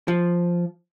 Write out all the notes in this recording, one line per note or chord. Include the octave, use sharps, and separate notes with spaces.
F3